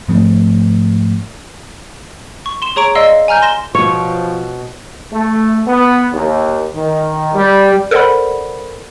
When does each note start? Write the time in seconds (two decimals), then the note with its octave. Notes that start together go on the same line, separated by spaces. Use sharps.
0.08 G#2 F3 A3 C4
2.46 C#6
2.62 C6 E7
2.76 G#4 C#5 A#5 C#6 D7 F7
2.95 D5 D#5 F5 C6 E6
3.28 G#5 A#5 F6 G6
3.42 C6 A#6 E7 G7
3.75 B2 F3 C#5 C#6
5.12 A3
5.67 B3
6.12 D#2
6.75 D#3
7.34 G3
7.91 A4 A#4 C5 D5 F#5 B5